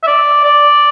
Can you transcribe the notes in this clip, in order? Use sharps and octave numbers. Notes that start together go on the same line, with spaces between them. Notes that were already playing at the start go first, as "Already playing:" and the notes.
E5
D5
D5